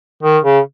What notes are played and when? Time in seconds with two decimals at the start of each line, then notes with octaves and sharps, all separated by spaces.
0.23 D#3
0.44 C#3